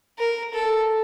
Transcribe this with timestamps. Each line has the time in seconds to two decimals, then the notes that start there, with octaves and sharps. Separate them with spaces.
0.19 A#4
0.54 A4